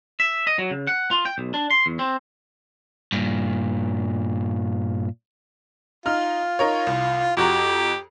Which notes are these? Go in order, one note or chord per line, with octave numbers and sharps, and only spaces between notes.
E5
D#5
F#3
C#3
F#5
F4
G5
B1
D4
C6
E2
C4
G2 A#2
D#4 F4 F6
D#4 A#4 C#5
C2
F2 F#4 G4 A#5